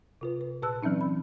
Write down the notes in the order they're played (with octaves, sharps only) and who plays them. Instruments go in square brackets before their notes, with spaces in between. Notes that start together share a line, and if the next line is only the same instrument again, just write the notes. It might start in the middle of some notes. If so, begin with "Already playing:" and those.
[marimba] C3 F4 B4
B4
A#2 B4 A5 E6 F#6
E3 F#3 C4 C#4 D#4
B5